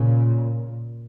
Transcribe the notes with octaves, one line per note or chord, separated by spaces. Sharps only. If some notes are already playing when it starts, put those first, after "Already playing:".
Already playing: A#2 C#3